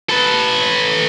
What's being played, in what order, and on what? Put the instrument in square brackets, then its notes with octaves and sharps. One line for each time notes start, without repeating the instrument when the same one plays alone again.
[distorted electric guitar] A4 B4